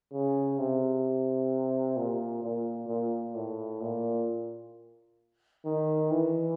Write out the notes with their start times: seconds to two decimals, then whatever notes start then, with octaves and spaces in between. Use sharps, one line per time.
0.13 C#3
0.58 C3
1.97 A#2
2.43 A#2
2.89 A#2
3.35 A2
3.81 A#2
5.65 D#3
6.11 E3